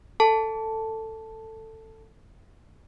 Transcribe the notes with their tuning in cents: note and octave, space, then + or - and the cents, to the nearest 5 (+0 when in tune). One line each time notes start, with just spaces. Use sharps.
A4 +15 A5 +0